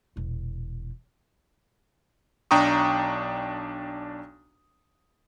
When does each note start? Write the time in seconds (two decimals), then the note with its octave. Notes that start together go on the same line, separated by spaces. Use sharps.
0.16 E1 A#1
2.51 B1 D4 G5 A#5 C#6 D#6